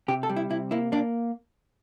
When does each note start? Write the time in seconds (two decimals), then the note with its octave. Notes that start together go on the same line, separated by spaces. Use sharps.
0.08 C3 G4
0.23 A4
0.29 G3
0.36 E4
0.50 C3 E4
0.71 A#3 E4
0.92 A#3 D4